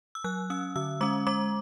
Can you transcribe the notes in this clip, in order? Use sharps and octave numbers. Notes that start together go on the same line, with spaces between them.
E6
F#3 F#6
C#4 E6
D3 E6
G#3 C#4 D6
G#3 D6